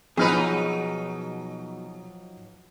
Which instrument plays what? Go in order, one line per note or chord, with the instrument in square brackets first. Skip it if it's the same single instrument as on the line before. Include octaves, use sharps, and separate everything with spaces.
[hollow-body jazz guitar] B2 G#4 [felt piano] F3 F6 D#7 [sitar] F#3 D#4 B4